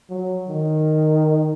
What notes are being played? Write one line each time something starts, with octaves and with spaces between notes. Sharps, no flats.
F#3
D#3